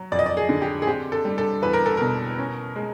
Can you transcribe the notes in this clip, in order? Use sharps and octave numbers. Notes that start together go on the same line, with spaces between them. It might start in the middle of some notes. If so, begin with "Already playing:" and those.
Already playing: F#3
F2 D5
D#5
D5
G#4
D3
G4
G#4
C4 G4
A4
G3
A4
E2 B4
A#4
A4
B2 A#4
C#4
G#3